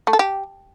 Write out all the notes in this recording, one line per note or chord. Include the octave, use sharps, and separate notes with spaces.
A3
A4
G4